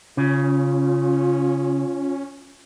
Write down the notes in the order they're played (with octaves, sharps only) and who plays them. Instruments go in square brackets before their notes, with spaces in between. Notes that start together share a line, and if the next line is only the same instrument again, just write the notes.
[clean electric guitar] C#3 [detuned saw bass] C#4 [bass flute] F4